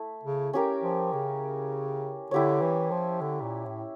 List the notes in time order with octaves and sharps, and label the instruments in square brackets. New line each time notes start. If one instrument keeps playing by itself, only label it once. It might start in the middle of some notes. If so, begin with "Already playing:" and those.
Already playing: [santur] A3 E4
[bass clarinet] C#3
[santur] C#4 G4 A#4
[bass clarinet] F3
C#3
[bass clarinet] D3 [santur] E4 G4 C#5
[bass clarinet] E3
F3
D3
A#2
A2